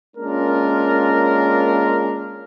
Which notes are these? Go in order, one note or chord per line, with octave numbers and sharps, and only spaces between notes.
G#3 A#3 C#4 D4 F4 A#4